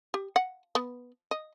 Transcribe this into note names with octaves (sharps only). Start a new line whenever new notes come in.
G4
F#5
B3
D#5